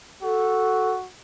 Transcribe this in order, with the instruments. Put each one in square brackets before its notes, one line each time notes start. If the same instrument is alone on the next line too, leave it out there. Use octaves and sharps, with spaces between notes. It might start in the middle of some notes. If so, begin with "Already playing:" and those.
[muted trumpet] F#4 [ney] A4